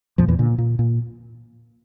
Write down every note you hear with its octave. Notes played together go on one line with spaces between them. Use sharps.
F2 A#2 F3
E2 E3
A#2 D3
A#2
A#2